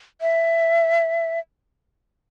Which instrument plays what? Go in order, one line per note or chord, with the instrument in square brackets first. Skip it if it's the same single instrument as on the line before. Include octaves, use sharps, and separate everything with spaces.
[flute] E5